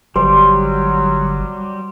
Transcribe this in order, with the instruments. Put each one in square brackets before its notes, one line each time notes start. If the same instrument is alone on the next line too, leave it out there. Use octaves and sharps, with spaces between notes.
[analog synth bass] G1 [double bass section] F#3 [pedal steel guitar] G3 [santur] C5